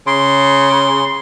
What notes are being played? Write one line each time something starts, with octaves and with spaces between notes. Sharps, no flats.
C#3 C6